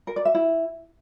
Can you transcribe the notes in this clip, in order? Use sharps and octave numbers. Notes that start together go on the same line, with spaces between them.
A#4
D5
E5
E4